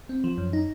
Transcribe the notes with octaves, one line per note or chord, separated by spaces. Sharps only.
C4
F3
F#2
D#4